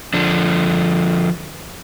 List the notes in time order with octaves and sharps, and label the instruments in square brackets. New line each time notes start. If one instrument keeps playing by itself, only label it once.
[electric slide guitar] D3 F3 D4